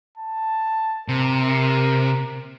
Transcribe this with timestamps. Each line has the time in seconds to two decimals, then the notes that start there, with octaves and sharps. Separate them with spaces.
0.18 A5
1.08 C3 A#4